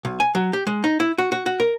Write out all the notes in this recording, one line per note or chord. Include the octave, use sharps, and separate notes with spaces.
B1
G#5
F#3
G4
G#3
D#4
E4
F#4
F#4
F#4
A#4